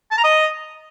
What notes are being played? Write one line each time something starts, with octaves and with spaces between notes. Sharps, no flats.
A5
A#5
D#5